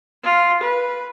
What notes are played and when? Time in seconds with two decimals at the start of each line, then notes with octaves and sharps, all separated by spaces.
0.24 F4
0.63 B4